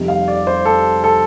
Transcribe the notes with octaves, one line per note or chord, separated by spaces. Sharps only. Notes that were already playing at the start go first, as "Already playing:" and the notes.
Already playing: F1 F2 C3 G3
F5
D5
C5
A4
A4